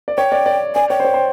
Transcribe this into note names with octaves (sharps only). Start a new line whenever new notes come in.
D5
C#5 G5
D5
D5
D5 G#5
C#5 G5
C5
C#5
C5